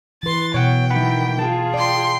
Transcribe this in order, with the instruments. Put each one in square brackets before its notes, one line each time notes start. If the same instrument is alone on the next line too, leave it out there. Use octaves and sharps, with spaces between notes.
[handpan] E3 B4 [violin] C6 A6
[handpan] B2 [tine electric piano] C#5 F#5 [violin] G5
[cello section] D#3 E3 [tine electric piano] F#5 B5
[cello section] F4 G#4 [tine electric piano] A5
[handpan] D5 [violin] G5 C6